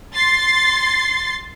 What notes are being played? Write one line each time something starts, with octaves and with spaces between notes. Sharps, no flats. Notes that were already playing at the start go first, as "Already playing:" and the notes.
C6 A6 C7